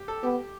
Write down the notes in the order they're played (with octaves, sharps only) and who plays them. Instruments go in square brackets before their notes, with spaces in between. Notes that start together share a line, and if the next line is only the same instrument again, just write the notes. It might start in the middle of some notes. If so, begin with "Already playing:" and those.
Already playing: [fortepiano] G4
A4
[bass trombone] B3 [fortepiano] G4